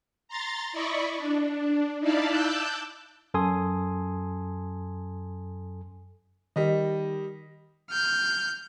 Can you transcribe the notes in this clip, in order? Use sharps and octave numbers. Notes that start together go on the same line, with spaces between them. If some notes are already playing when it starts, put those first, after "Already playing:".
A#5 C6 A6
E4 D5 D#5 B5 C#6
D4
D#4 E4 D5 F5 A5 B5
A5 D6 E6 F#6 G6
F#2 A4 G#5 C6 D#6
D#3 G3 D#5
F6 G6